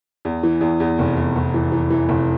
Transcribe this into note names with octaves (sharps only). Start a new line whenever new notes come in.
E2
E3
E2
E2
F1
E2
F1
E3
E3
E3
F1